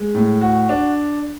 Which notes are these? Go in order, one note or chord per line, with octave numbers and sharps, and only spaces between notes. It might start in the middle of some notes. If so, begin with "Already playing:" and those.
Already playing: G#3
A2
F#4
D4